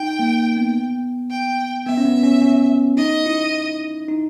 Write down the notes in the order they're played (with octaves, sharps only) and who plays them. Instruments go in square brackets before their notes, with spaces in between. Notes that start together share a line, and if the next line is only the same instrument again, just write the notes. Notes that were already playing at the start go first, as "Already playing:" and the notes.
Already playing: [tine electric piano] D#4 [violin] G5
[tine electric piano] A#3
B3
[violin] G5
[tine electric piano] B3 [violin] E5
[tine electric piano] C#4
B3
C#4
C#4
[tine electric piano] D#4 [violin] D#5
[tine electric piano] E4
D#4